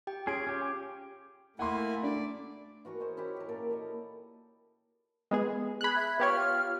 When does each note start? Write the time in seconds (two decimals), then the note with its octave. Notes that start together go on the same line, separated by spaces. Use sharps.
0.07 G4 G5
0.27 C#4 F4 G#4 G#6 D7
0.47 C#4 G4
1.59 A3 A#3 E4 F#5 G#5 C6
2.03 D4 D5
2.85 E3 F#4 A#4 C#6
3.00 G#4 C5 D#5
3.17 C#4 E4 G4
3.36 G4 A#4
3.49 A#2 A4 A#4 D6
3.71 A4 C#5 D#5
5.31 G#3 B3 G#4
5.81 G#4 B5 F#6
5.95 E5 G#6
6.20 B3 F4 G4 C#5 F6